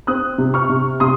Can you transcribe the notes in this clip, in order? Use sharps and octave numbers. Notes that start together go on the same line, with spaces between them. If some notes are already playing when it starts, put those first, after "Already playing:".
C4 D#6 F#6
C3
C#6 F6
C3
C3 C6 D#6